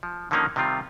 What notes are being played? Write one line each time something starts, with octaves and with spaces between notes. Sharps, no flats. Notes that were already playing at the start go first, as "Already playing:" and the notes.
F3
D3 D#3 F3 A#3 C#4 D#4
C3 D#3 G3 C4 F4